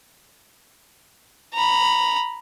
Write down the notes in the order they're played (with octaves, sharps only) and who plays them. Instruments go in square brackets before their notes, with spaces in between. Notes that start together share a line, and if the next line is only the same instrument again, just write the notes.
[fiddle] A#5 B5